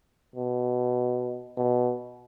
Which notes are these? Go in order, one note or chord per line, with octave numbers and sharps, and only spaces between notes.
B2
B2